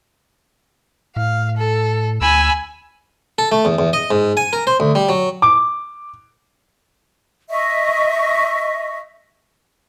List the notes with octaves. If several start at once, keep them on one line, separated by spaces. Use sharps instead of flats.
A2 F5
A4
D2 G#5 B5 E6
A4
A3
E2
E2
D#5
G#2
G#5
A#4
C5
D2
G3
F#3
D6
D#5 E5 C#6